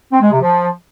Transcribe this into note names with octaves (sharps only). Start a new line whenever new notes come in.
C4
G#3
C3
F3